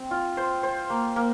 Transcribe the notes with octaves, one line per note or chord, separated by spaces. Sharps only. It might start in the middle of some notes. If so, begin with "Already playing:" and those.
Already playing: C4
F4
C5
C5
A#3
A#3